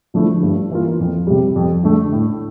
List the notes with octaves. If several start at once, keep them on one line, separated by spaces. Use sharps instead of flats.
D3 F3 A3 E4
G2
E3 A#3 F4
F2
C3 G3
F2
D3 A3
A2